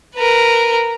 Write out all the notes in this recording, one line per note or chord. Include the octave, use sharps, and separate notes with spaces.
A#4 B4